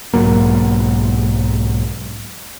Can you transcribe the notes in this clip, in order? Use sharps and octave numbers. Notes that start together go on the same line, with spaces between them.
B1 G#2 F#3 A#3